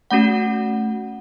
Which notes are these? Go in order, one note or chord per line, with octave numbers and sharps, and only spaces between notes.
A3 C#4 F#4 F#5